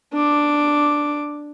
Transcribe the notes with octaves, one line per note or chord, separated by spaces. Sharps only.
D4 D6